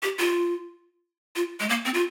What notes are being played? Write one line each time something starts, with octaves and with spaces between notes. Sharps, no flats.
G4
F4
F4
G#3
A#3
C4
F4